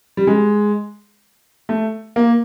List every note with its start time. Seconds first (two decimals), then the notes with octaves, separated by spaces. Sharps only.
0.17 G3
0.27 G#3
1.69 A3
2.16 A#3